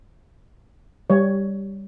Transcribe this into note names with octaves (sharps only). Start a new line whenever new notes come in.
G3 C#5